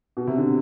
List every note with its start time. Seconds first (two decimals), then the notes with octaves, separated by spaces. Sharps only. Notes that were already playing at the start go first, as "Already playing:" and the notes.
0.17 B2
0.27 C3
0.37 D3